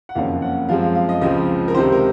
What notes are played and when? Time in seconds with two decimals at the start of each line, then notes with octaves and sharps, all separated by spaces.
0.09 F#5
0.15 F#1 F2 D#3 A#3 C#4 F5
0.42 F#5
0.68 F#2 F3 G#3 C4 F5
0.82 F5
0.95 F5
1.09 D#5
1.21 C#2 C#3 F3 G#3 C4 D#5
1.68 A#4
1.74 C#2 C3 D#3 C5
1.92 A#4